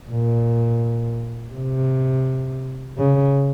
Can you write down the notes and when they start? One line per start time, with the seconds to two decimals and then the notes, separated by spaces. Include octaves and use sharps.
0.11 A#2
1.54 C3
2.98 C#3